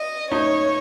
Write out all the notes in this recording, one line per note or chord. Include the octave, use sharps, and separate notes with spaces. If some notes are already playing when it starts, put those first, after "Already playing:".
Already playing: D#5
D#4 C#5